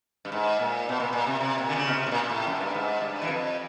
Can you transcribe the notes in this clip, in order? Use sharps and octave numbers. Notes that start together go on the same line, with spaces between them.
G2
G#2
A#2
B2
A#2
A#2
C3
C3
A#2
D3
C#3
B2
C3
A2
A#2
A#2
A2
F#2
G2
G#2
G2
E3
F2